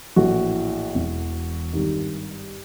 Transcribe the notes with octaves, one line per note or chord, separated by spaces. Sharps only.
A#1 A2 E3 F#4
E1 E2 B2
G#1 G2 D#3